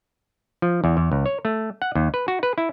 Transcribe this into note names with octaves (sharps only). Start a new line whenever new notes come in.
F3
E2
E2
C#2
C#5
A3
F#5
D#2
B4
F#4
B4
E4